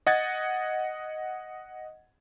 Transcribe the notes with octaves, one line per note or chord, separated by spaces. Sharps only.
D#5 F#5 G#6 A6